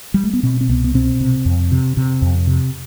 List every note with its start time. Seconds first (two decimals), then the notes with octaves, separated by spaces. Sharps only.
0.14 G3
0.24 A3
0.33 B3
0.43 B2 C4
0.61 C4
0.68 C2 B3
0.84 B3
0.94 B2 C4
1.21 C3
1.46 F2
1.72 C3
1.97 C3
2.22 F2
2.47 C3